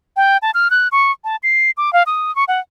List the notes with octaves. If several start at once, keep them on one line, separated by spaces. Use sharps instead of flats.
G5
A5
F6
F#6
C#6
A5
C7
D6
F5
D#6
C#6
F#5